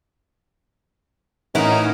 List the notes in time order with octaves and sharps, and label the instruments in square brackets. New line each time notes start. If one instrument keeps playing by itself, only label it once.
[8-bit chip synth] A2 E3 C#4 [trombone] D#4 [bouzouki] E4 F#4 A#4